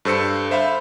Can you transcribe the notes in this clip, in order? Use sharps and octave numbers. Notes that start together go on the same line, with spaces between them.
G2 A4 C5 E6 C#7
C5 E5 F5 B5